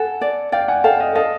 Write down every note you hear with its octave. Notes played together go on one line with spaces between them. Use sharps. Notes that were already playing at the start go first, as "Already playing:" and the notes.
Already playing: A4 F#5 G#5
D5
D5 F5 G5
F#5 G#5
A4 F5 G5
D#5 F5
A4 D#5 F5